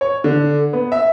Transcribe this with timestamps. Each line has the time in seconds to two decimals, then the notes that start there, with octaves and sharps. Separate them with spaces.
0.01 C#5
0.24 D3
0.73 B3
0.92 E5